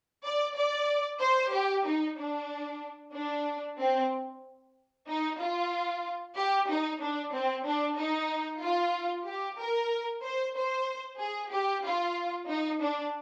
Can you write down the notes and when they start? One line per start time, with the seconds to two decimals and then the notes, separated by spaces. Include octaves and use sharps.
0.25 D5
0.57 D5
1.21 C5
1.53 G4
1.86 D#4
2.18 D4
3.14 D4
3.79 C4
5.07 D#4
5.39 F4
6.36 G4
6.68 D#4
7.00 D4
7.32 C4
7.65 D4
7.97 D#4
8.61 F4
9.26 G4
9.58 A#4
10.23 C5
10.55 C5
11.19 G#4
11.51 G4
11.84 F4
12.48 D#4
12.80 D4